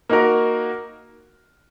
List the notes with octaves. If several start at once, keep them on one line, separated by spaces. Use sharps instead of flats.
A#3 D#4 F#4 A#4